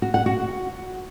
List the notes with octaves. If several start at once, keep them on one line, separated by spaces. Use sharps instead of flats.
F#4
F#5
F#4